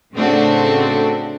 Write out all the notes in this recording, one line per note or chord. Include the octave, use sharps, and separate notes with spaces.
A2 C#3 A3 C4 D4 F#4